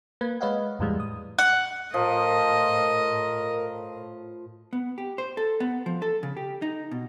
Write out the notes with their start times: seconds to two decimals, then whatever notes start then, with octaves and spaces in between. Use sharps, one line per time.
0.21 A#3 B4 G#6
0.41 G#3 B4 C#5 D#5 F5 F#5
0.79 E2 A2 E3 G3 G#3
1.00 D#6
1.39 F#5
1.94 A2 F3 A#4 D#5
4.73 B3
4.98 G4
5.18 C5
5.37 A4
5.60 B3
5.86 F3
6.02 A4
6.23 C#3
6.37 G4
6.62 D#4
6.91 B2